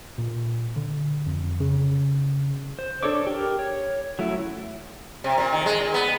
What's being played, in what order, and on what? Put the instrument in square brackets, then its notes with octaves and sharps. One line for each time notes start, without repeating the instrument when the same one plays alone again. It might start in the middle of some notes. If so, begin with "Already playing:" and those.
[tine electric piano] A#2
D3
F2
C#3
[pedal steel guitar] C5
D4 A4 C#5 D5 D6
G4 A#4
C#5
F#3 A3 C#4 E4
[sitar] C3
A#2
D#3
G#3
A#2
B3